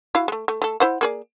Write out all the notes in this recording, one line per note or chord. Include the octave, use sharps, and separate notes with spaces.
E4 F#4 F5
G#3 A3
A3
A3 A4
E4 C5 F#5
A#3 G#4 D5